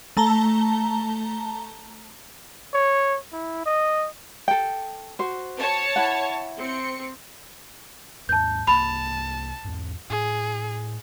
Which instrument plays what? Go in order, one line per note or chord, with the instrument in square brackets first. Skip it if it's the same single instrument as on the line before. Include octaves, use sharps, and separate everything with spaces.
[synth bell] A3 A5 A#5 G7
[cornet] C#5
E4
D#5
[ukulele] A4 G5
F#4 C5
[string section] C#5 A5
[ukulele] E4 F#5
[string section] C4 C#7
[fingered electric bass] D#2 G#2 [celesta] A5 G6
[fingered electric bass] C2 A#3 [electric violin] A5 [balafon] B5 [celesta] F7
[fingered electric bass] E2 G#2
[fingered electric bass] A2 [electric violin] G#4